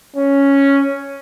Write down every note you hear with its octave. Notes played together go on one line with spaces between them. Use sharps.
C#4